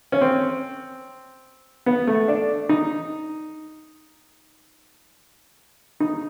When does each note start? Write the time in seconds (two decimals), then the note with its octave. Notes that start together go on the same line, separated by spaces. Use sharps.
0.12 C#4
0.21 C4
1.86 B3
2.07 A3
2.28 D4
2.69 D#4
6.00 D#4